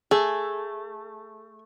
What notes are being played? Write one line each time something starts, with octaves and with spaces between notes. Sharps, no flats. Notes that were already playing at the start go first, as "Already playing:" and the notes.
A3 G#4